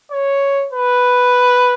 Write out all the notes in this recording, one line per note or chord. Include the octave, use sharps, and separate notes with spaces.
C#5
B4